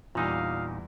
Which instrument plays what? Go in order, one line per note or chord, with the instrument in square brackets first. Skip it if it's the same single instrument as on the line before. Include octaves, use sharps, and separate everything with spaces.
[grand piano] E2 G3 [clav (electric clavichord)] A#2 D#4 [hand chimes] F4 D#6 E6 [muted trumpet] F5